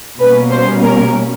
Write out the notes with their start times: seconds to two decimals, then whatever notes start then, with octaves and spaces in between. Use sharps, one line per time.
0.19 B2 G3 A#3 C#4 B4
0.51 C5
0.82 A#4